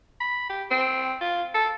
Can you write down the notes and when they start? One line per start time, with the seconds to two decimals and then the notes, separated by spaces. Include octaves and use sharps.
0.20 B5
0.49 G4
0.71 C4
1.21 F4
1.54 A4